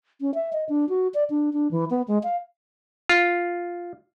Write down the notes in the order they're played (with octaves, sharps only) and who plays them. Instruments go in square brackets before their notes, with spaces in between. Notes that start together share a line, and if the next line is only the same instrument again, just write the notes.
[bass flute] C#4
E5
D#5
D4
F#4
D5
D4
D4
E3
B3
G#3
F5
[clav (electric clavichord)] F4